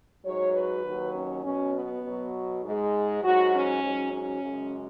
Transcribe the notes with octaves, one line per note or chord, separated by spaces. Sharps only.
G#2 F#3 C#5
B4
D#2 D#3 F#3
C#4
B2 F#3 C#4
B3
B2 F#3
G#2 G#3
G#2 F#3 F#4
C#4
G#2 F#3
C#4
F#2 C#3 G#3